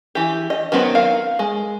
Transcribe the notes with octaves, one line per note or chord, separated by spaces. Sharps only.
E3 G4
D#5
D#3 F#3 B3 C4
A#4 F5
G#3